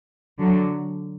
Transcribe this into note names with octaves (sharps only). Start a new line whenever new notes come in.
D3 F#3